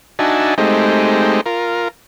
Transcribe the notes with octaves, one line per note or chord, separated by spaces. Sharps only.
D4 D#4 F#4 E5 G#5 A5
G#3 A3 C4 D#4 G4
F4 A#4